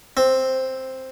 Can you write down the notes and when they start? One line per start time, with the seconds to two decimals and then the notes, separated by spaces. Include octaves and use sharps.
0.17 C4